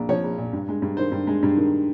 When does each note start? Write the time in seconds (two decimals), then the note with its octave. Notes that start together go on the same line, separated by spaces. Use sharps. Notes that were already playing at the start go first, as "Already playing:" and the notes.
Already playing: A#1 A#2
0.09 F3 C#5
0.24 A#1
0.38 A#2
0.53 G2
0.68 G#3
0.82 G2
0.97 D#3 C5
1.12 G2
1.27 G#3
1.43 G2
1.57 D#3